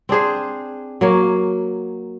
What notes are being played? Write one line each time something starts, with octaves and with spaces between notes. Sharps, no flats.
C4 D4 G#4 C5
F#3 A#3 C#5